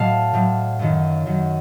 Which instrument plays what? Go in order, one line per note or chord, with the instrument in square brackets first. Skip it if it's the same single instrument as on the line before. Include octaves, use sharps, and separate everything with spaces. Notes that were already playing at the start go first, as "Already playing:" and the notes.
Already playing: [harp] A2 F#3 D#5 F5 A5
A2 F#3
F#2 D#3 F#3
F#2 D#3 F#3